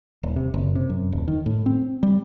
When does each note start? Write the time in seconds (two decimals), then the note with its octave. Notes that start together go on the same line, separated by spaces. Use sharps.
0.23 D#1
0.36 C3
0.54 F#1
0.75 C3
0.89 F#2
1.12 D#1
1.28 D#3
1.46 A2
1.66 C4
2.03 G3